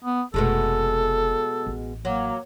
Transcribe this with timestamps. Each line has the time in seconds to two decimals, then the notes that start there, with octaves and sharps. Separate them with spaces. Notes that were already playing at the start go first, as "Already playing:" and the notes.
0.04 B3
0.34 F1 B2 G#3 A3 A4
1.66 A1
2.05 F#3 A#3